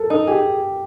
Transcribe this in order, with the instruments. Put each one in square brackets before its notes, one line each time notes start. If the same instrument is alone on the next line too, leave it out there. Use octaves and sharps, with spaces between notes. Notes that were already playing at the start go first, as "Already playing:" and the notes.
Already playing: [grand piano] A4 A#4
[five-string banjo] D#4 [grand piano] A4
[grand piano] G4 [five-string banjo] G#4